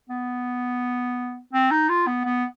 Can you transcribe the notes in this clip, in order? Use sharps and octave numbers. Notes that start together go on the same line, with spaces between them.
B3
C4
D#4
F4
B3
B3